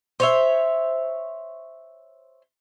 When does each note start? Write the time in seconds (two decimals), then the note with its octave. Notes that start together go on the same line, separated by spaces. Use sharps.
0.20 C5 C#5 E5